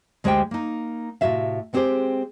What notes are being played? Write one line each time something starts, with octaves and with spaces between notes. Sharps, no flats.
D2 G#3 G4 C5 D5 G5
A#3 D#4
A2 C3 F#4 E5 F5
G#3 B3 C4 G4 G#4 C5